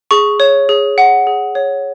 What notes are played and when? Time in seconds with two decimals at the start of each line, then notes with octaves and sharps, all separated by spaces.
0.11 G#4 C#6
0.40 C#5
0.69 G#4
0.98 F#5
1.27 G#4
1.55 C#5